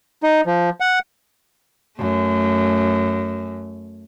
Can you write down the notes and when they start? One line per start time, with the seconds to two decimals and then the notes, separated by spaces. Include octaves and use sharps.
0.23 D#4
0.46 F3
0.80 F#5
1.98 F#2 A3